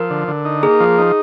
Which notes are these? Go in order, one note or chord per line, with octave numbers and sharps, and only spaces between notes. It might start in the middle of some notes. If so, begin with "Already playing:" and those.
Already playing: F3 A#4
D3
D3
D#4
A#3 G#4
F3
D#4